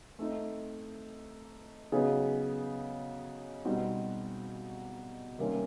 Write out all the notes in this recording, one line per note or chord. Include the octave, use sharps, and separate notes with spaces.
A3 C4 D#4
C#3 F#3 B3 D#4 G#4
B2 G3 C4 D#4 F#4
C3 D#3 G3 A#3 C#4